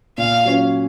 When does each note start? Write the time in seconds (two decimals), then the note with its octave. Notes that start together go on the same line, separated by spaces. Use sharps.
0.18 A#2 F5
0.45 F#3 C#4 F4